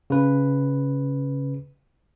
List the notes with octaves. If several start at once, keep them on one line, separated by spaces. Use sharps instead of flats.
C#3 B4